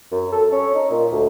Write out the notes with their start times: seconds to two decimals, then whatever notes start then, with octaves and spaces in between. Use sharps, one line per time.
0.11 F#2
0.32 A4
0.52 C#4
0.75 D#4
0.91 A#2
1.12 D2